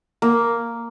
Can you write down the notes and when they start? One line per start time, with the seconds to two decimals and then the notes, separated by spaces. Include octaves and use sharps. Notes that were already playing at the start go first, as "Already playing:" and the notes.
0.22 A#3